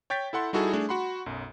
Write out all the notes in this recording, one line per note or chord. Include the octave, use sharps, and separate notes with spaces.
C#5 G5 G6 A6 B6
E4 A4 F#5 C6
G3 D#4 E4 F#4 G#4 A4
A3 D4 G#4
F#4 F#5 B5 C6
B1 F#2